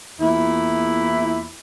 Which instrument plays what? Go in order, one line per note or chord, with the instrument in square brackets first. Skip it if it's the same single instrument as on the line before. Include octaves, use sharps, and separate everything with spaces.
[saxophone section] E2 A#2 E4